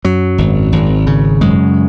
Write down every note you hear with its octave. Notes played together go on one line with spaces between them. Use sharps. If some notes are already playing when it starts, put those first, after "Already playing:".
F#2 F#3
G#1
G#1
C#3
F#2 G#3